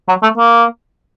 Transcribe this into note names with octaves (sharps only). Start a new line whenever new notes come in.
F#3
A3
A#3